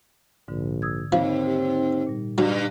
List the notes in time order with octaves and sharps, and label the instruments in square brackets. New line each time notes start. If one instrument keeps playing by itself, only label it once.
[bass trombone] A#1 [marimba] G#2 D3
[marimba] D#6 E6 G#6
[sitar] D#2 [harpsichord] F3 [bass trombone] C4
[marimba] G4
A#2 G3
[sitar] G2 [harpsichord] F#3